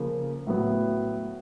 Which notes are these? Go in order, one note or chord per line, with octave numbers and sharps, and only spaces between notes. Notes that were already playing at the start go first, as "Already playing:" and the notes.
Already playing: C#3 F3 A#3
A2 F#3 B3